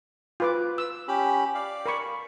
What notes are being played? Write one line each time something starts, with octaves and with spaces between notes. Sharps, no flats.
F4 B4 D6
E6
C#4 G4 B5
D5 F5
A#4 B5 C#6